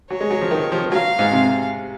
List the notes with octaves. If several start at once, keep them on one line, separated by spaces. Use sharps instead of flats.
F#3 C#5
G#3
F#3
F3
D#3
F3
F#3 F5
G#2
C3